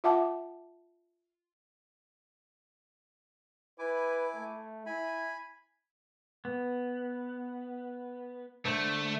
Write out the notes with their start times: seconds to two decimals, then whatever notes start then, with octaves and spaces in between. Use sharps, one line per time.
0.04 F4 E5 F#5 A5 D6
3.79 E4 B4 G#5 D6
4.34 A3
4.86 E4 G#5 B5
6.45 B3
8.65 D3 A3 C5